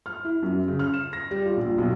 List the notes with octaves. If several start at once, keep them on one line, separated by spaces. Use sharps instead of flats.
F6
E4
F#2
C#3
F6
E7
A#6
G3
F4
A#1
B1